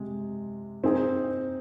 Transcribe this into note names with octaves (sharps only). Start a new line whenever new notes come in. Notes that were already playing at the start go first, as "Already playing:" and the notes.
Already playing: C3 G#3
C4 D#4 G#4